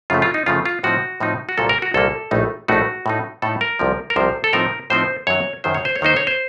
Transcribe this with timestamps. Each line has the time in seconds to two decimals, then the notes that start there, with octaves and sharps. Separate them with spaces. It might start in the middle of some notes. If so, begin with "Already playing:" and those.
0.10 F#2 C#3 F3 A3 F4
0.22 F4
0.34 D#4
0.46 F#2 C#3 F3 A3 F4
0.66 F4
0.84 A2 F3 C4 D#4 F#4
1.20 A2 F3 C4 D#4
1.49 F#4
1.57 C2 A#2 F#3 A#3 A4
1.69 A#4
1.82 F#4
1.94 C2 A#2 F#3 A#3 A4
2.31 A#1 A2 A3 D#4
2.68 A#1 A2 A3 D#4 F#4
3.06 A2 A3 D#4
3.42 A2 A3 D#4 A4
3.61 A#4
3.79 C2 C3 F3
4.10 A#4
4.16 C2 C3 F3 C5
4.44 A4
4.53 A2 F3 C4 D#4 A#4
4.90 A2 F3 C4 D#4 C5
5.27 F#2 D#3 F#3 C#5
5.64 F#2 D#3 F#3 C5
5.74 C#5
5.85 C5
5.96 C#5
6.01 D#2 D#3 A#3 D#4 C5
6.16 C#5
6.27 C5